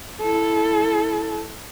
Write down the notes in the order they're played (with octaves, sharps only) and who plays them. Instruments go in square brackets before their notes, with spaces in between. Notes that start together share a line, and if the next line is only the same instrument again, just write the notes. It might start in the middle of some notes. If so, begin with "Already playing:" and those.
[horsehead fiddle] E4 A4